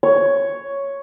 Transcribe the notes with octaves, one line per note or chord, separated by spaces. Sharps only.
C#5